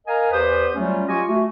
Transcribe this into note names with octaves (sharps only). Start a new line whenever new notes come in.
A#4 D#5 F5 G#5 A#5
E2 G4 B4 C5 D#6
F#3 G3 A3 C#4 F4
F4 G4 D#5 G#5 C#6
A3 F#4